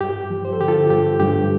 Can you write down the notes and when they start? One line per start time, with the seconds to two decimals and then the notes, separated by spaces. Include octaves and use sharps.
0.01 G2 G4
0.30 F3
0.45 C5
0.53 A4
0.60 D3 G4
0.68 F4 A4
0.90 G2 G4
1.20 G2 G4